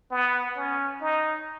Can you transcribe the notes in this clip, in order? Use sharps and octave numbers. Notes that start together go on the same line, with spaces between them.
B3
C#4
D#4